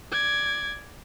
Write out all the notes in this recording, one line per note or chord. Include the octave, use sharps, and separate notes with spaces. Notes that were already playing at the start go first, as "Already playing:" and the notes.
D5 G#6